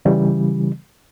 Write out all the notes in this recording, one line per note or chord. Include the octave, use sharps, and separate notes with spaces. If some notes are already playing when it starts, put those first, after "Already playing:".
C#3 E3 G3